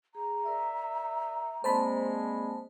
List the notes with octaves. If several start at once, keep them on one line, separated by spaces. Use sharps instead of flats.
G#4 A#5
A#4 D5 E5
G#3 A#3 C4 C5 D5 A5 B5